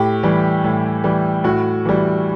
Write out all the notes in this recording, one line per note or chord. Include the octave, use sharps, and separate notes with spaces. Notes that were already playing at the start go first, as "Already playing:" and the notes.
Already playing: A2 G4
E3 G3
A2
E3 G3
A2 F#4
E3 G3